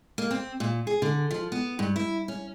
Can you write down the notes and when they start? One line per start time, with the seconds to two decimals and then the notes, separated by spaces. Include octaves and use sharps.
0.18 A#3
0.31 C4
0.60 A#2
0.87 G#4
1.02 D3
1.31 F3
1.52 B3
1.79 G2
1.96 E4
2.28 C#4